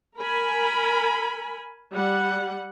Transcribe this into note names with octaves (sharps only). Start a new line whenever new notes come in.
A#4 G#5 B5
G3 F#5